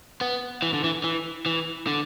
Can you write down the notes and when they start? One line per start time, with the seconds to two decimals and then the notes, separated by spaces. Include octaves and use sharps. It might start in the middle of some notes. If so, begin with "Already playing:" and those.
0.21 B3
0.62 E3
0.73 D3
0.84 E3
1.04 E3
1.46 E3
1.87 D3